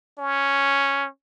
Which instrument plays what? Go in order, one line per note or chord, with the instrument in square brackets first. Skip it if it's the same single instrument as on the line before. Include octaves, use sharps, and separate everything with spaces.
[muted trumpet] C#4